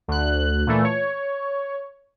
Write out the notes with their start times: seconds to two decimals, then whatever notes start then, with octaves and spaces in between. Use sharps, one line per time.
0.08 D2 F#6
0.67 A#2 E3 A3
0.84 C#5